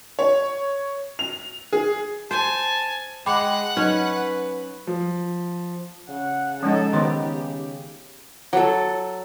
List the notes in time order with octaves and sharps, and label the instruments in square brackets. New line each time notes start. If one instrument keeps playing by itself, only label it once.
[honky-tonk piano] C#5
F7
G#4
[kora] C5 [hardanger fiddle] G#5 [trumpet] A5
[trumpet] G#3 [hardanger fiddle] F#5 [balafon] G5 B5 D6
[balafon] F#3 D#4 [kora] C#4 [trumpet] B4
[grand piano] F3
[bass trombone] C#3 [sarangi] F#5
[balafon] F3 G#3 A5 [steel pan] C#4 D#4 [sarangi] A4
[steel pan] D#3 B3 D#4 [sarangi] G4 [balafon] C5 C6
[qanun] F#3 A4